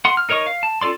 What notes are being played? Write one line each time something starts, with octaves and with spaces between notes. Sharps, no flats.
F#5 C6
F6
D#4 A#4 C#5 D#5 C#6
F5
A5
C#4 F4 A4 D5 C6